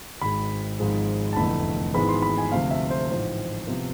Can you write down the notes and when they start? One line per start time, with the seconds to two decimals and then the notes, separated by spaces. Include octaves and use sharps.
0.21 G#1 G#2 G#3 B5
0.79 G#1 G#2 F3 G#3
1.33 A5
1.37 F1 E2 D3 A3 B5
1.94 G#1 G#2 E3 G#3 B3 B5
2.09 C6
2.22 B5
2.38 G#5
2.52 D2 C3 F3 A3 F5
2.71 E5
2.90 C5
3.10 A1 G#2 F3
3.67 C3 F3 B3